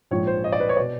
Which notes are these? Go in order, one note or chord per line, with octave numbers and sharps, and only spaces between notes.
A#1 G#2 F3 C#5
C5
D#5
D5
B4
C#5
B2 D5